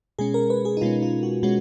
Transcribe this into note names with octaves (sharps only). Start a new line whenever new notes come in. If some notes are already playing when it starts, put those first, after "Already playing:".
B2 G#3 C#4 G#4
A#4
B4
G#4
D#4
B2 G#3 C#4 F4
F4
F#4
B2 G#3 C#4 F#4